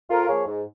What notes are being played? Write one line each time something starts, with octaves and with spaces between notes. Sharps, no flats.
F2 F4 A#4
F3 A#3 G#4 C#5
G#2